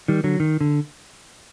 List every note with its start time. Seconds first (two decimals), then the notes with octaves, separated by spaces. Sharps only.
0.08 D#3 G3
0.24 D3 F#3
0.40 D#3
0.61 D3